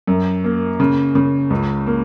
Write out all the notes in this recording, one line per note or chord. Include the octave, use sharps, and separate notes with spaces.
F#2
A#3
C#3
C#3
C#2
A#3